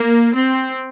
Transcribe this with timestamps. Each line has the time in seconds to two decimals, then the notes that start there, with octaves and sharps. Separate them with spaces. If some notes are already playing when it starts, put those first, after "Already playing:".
Already playing: A#3
0.34 C4